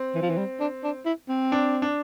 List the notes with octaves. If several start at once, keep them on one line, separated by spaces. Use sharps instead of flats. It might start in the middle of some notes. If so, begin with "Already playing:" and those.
Already playing: C4
E3
F3
E3
G3
D4
D4
E4
C4
D4
D4